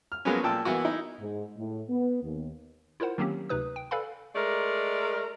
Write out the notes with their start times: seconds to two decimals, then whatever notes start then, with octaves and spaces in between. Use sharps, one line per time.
0.12 F6
0.25 F3 F#3 G#3 A#3 B3 C#4
0.43 A#2 F3 G5 A5 E6
0.65 E3 A#3 B3 E4 F#4
0.85 D#4 E4
1.20 G#2
1.58 A2
1.90 B3
2.24 D#2
3.00 E4 F4 A#4 C5 F#5
3.18 D#3 F#3 A#3 C4 C#4 G4
3.49 D2 C3 D#4 B4 D#6
3.76 G5
3.91 A4 B4 D5 F5 G#5 B5
4.36 G#3 A3 A#4 D5